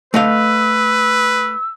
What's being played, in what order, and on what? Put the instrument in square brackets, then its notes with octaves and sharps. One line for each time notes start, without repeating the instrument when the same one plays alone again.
[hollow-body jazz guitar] A3 D#5 F5 [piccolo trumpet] B4 [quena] E6